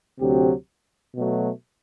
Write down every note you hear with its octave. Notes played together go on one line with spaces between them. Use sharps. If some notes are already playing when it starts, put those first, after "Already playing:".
D2 C3 F#3 C4 G4
B2 F#3 A3